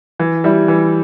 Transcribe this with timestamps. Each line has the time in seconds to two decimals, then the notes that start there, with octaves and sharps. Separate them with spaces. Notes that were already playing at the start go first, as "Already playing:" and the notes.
0.19 E3
0.44 G3 E4
0.68 E3